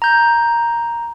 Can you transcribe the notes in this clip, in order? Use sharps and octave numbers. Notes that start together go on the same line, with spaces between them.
A#5 G6